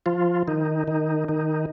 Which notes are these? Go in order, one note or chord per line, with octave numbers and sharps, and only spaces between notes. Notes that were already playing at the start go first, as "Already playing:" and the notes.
F3 F4
D#3 D#4
D#3 D#4
D#3 D#4